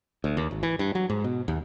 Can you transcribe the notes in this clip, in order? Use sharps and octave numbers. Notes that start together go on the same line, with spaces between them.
D2
D#2
G#1
E3
G2
F#3
G#2
B2
D#2